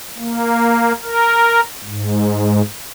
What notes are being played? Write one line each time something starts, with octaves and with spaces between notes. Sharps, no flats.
A#3
A#4
G#2